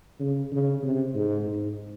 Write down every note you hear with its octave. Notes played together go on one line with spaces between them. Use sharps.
C#3
C#3
C3
G#2
G#2